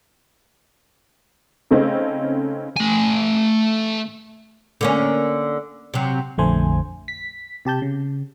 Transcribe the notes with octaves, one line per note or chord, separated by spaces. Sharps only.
C#3 A3 C4 C#4 D#4
A3 G#5
D3 A#3 C#4
C3 F#3
A#1 F2 D3 A3 C5 G#5
B6
C3 G4 A5 G6
C#3